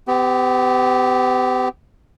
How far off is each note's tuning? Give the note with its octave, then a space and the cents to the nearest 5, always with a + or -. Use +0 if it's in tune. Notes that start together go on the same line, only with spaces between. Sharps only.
B3 +45 G4 +0